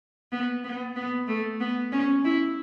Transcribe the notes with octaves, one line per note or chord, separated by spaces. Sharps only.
B3
B3
B3
A3
B3
C#4
E4